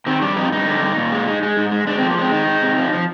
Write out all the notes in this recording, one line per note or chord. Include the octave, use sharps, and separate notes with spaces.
D#3 C4
G3 D4
F2 D#4
G2 D#4
D3
G2
A#2
G#3
G#3
G#3
G#2
G#3
G#3 D4
C4
F3
A#3
G#3 C4
D#3 D#4
G#3
C3
F3
F3